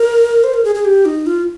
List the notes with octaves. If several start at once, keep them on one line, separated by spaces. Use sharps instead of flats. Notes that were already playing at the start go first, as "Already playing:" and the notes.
Already playing: A#4
C5
A#4
G#4
G#4
G4
D#4
F4